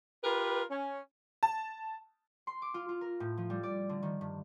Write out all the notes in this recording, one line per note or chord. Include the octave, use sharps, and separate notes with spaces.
F4 G4 A#4 B4
C#4
A5
C6
D6
F4
F4
A#4
A2
F3
G3
D5
D3
D#3
G2